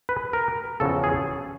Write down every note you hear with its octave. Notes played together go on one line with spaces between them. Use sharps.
B4
A#4
E2 C#3 F3 A4
G#4